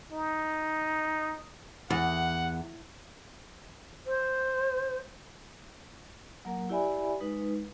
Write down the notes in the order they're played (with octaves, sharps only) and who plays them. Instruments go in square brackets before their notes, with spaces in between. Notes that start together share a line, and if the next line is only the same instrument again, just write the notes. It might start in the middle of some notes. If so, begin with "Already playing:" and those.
[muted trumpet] D#4
[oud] E2 [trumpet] F#5
[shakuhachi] C5
[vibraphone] F#3 A#3 A#4 F#5
E4 G4 D5 E5 G#5 B5
G#3 D#4 B4